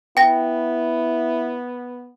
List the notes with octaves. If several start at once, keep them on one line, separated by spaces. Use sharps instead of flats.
B3 E4 G5 A#6